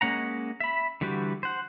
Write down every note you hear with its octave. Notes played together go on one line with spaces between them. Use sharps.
G#3 A#3 C#4 F#5 A#5
E5 B5
D3 E3 G3 F#4 G4
C5 F#5